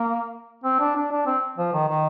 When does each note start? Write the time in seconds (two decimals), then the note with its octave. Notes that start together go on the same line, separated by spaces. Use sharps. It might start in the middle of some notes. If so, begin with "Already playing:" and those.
Already playing: A#3
0.64 C4
0.80 D4
0.96 D4
1.11 D4
1.26 C4
1.58 F3
1.73 D#3
1.88 D#3